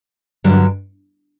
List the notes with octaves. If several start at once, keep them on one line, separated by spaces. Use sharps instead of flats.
G2 D3 F#3